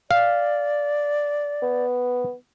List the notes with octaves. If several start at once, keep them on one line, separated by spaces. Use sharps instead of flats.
D5 F5
B3